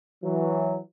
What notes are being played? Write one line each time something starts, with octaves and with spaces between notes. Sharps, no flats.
E3 F#3